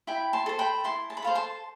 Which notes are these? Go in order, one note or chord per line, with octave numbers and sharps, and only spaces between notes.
E4 G5 B5
A5 C6
A4 C5
G5 B5
E4 A5 C6
A5
B5
A4 C5 F5 A5
A5 C6